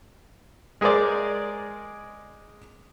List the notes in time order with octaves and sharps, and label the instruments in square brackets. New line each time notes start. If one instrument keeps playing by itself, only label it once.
[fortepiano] G#3 G#4 A#4 C5 D5